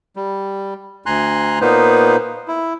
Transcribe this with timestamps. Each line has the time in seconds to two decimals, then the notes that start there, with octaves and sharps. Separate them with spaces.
0.16 G3
1.06 D2 G#5 A#5 C6 F#6
1.61 A#2 A#3 B3 D#4 B4 C5
2.48 E4